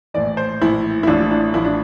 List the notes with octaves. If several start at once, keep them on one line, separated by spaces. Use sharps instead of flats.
A#1 A2 E3 D5
C5
A#1 A2 E3 E4
E4
A1 A2 F3 D4
D4
A1 A2 F3 E4
D4